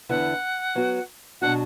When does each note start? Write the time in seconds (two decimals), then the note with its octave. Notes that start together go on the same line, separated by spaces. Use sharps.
0.09 E2 D3 B3 E4 B4 F#5
0.75 F#3 B3 F#4
1.41 B2 F#3 D4 F#4 F#5